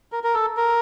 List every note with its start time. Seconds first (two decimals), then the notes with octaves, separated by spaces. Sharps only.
0.12 A#4
0.23 A#4
0.34 A4
0.57 A#4